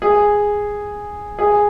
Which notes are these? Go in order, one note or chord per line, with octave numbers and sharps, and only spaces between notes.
G#4
G#4